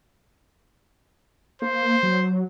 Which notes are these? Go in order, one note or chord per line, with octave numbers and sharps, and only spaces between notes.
A#3 C5
F#3